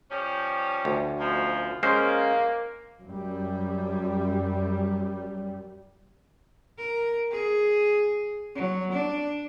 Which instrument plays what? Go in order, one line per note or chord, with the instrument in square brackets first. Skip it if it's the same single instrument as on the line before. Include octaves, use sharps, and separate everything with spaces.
[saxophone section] F3 G3 C#4
[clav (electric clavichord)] D2
[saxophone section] F#2 B2 F3
[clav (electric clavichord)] G#3 C#4 C5 [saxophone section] A#3
[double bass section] F#2 G3
[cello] A#4
G#4
F#3
D4